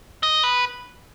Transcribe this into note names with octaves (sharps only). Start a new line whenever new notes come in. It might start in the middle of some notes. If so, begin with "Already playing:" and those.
D#5
B4